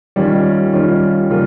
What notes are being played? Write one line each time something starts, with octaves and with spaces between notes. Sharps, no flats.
D#3 G3 C#4 F4
D#3 G3 C#4 F4
C#3 G3 A#3 F4